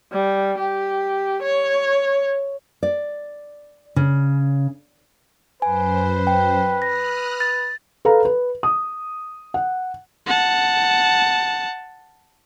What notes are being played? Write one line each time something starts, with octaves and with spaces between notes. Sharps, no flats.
G3
G4
C#5
D5
C#3
F#2 B4 C5 G#5
G5
D#6 F6 F#6 A#6
A6
A4 B4 F5 A#5
B4
D#6
F#5
F#5 A5